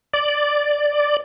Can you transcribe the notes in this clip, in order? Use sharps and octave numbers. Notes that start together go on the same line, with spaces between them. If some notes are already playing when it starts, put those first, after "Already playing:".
D5